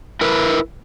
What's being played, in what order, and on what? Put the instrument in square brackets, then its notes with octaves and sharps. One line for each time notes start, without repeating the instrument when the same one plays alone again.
[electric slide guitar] E4 A#4 B4